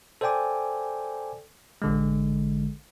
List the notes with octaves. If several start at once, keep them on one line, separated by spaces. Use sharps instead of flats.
A4 C5 D5 G5 G#5 D6
A1 D3 G#3